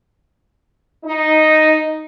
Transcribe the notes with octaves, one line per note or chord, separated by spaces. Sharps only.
D#4